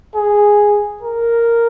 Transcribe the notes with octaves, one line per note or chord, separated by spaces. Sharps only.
G#4
A#4